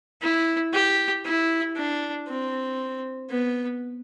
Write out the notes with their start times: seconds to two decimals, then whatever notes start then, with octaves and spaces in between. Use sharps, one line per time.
0.22 E4
0.73 G4
1.25 E4
1.76 D4
2.28 C4
3.30 B3